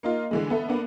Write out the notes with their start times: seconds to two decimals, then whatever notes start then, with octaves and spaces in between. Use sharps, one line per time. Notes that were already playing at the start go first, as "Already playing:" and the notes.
0.03 A#3 D#4 F4
0.31 D3 E3 G#3
0.50 B3 A4 E5
0.69 A#3 B3 D4